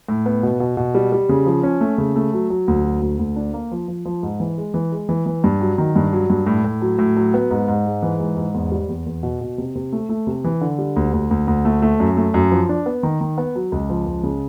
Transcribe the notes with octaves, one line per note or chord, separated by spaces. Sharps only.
A2
B3
B2
B2
B2
G3
G3
C#3
F3
C#4
A3
C#3
A3
F#3
F#3
D2
F#3
D2
D2
D4
A#3
F3
F3
F3
G#2
E3
G#3
E3
G#3
E3
E3
G2
F#3
D#3
G2
F#3
G2
A2
A2
F#3
A2
F#3
B3
G#2
G#2
G#3
E3
G#2
G#2
E2
G3
E2
E2
B2
B2
C3
C3
A3
A3
C3
E3
D3
G3
D2
D2
D2
D2
A3
A3
F#2
A3
F#2
F3
D4
B3
D#3
D#3
B3
F#3
C#2
F3
C#2
C#3